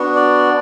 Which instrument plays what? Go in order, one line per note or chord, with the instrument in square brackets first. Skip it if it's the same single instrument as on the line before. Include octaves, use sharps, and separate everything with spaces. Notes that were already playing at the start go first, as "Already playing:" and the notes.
Already playing: [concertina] B3 D4 F#4
D5